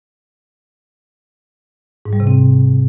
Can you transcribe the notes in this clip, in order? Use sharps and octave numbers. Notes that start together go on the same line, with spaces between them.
G#2
G3
C3
C4